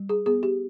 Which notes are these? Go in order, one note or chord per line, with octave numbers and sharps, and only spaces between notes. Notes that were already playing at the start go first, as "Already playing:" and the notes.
Already playing: G3
G#4
B3 G#4
G4